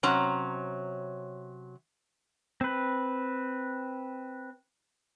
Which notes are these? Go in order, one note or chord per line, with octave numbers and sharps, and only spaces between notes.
C3 F#3 C#4 A#5
C4 B4